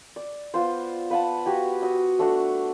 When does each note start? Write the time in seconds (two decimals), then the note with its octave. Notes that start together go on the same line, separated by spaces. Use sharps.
0.16 D5
0.54 B3 F4 C5
1.10 B4 F5 F#5 A5
1.46 F#4 G4 G#5
1.82 F#4 D#6 E6
2.19 A3 D4 F#4